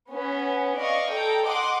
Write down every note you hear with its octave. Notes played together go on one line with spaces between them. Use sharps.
B3 C#4
D5 D#5 F5 C#6
A4 G5 A#5
D#5 F#5 C6 D6